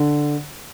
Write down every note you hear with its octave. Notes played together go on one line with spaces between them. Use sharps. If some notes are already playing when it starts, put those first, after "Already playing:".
Already playing: D3